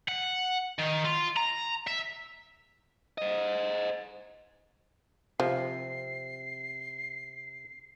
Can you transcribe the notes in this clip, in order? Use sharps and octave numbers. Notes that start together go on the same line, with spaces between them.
F#5
D#3
F4
A#5
E5
C5 D#5
C3 F3 C7